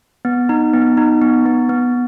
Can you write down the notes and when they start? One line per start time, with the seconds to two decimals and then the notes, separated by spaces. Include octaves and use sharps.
0.25 B3
0.49 D#4
0.73 B3
0.97 D#4
1.22 B3
1.46 B3
1.69 B3